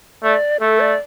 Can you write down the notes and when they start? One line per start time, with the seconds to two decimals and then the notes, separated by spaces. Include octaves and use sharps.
0.23 A3 D5
0.60 A3 A4
0.80 D5